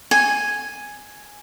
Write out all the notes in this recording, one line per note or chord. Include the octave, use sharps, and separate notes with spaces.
G#5